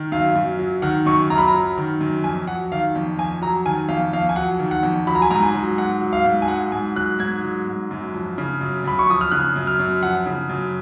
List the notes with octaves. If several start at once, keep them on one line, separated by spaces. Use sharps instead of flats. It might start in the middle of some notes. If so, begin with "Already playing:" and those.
Already playing: D#3
F#2 F5
F#2
F#3
D#3 F#5
F#2 C#6
F#2 A#5
B5
A#5
F#3
D#3
F#2
F2 G#5
F#3 F#5
D#3 F5
F2
F2 G#5
F#3 A#5
D#3 G#5
F2 F5
F2 F5
G#5
F#3 F#5
D#3
F#5
F2
F#3 B5
A#5
G#5
G#2 A#5
G#5
F#3
G#2 F#5
F#3
F5
G#2
G#5
F#3 F#5
G#2 G#5
F#3 F#6
G#2 G#6
F#3
G#2
F#2
F3
C#3
F#2
F#2 B5
C#6
F3 D#6
F6
C#3 F#6
F#2
F6
F#2
F3 F#5
C#3
F#2